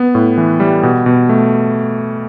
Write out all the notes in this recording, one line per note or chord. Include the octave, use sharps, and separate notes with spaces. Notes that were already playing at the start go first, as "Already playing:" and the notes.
Already playing: B3
A2
E3
G3
B2
B2
A3